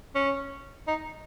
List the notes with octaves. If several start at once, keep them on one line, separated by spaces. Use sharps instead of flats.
C#4
D#4